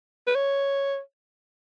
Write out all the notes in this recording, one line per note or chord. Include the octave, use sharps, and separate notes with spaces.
B4
C#5